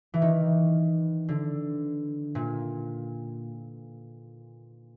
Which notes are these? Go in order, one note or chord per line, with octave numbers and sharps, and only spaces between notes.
E3
D#3
D3
A#2